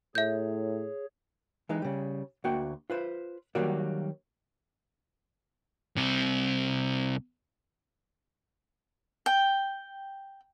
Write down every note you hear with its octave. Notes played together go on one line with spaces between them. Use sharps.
A2 G#4 C#5 E5 G6
E3 G#3 D#4
C#3 G3
D2 A#3 F#4 G5
F4 B4 C5
D#3 F#3 G3 A#3 F#4 D5
C2 C3
G5